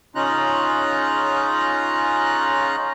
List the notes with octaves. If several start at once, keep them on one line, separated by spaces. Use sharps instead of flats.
C#3 C#4 D#4 F4 A#5 F#6